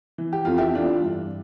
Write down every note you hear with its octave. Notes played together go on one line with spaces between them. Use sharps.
E3
G4
F2 F4
E4 G4
E3 D4 F4
G2